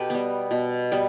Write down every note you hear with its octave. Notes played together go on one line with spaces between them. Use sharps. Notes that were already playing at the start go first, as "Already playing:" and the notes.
Already playing: B2 G4 A4 B4
G3 B3
B2
G3 B3